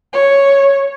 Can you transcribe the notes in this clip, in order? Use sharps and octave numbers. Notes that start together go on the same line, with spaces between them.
C#5